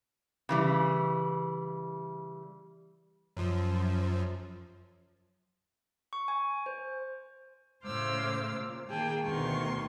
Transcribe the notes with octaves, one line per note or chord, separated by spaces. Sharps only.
C#3 E3 G3
F#2 F3
C#6
G#5
C5
A2 C#3 C5 D6 E6 F6
A#2
D#3 A#3 G#4 G5 A5
D2 B2 D#3 C6 C#6